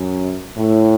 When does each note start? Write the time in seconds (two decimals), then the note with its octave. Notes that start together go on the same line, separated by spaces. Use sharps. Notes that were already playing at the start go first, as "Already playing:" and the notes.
Already playing: F#2
0.57 A2